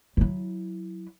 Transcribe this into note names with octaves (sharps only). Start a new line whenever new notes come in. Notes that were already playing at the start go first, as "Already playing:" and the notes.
F#3 E4